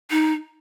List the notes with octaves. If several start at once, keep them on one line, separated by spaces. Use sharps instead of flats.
D#4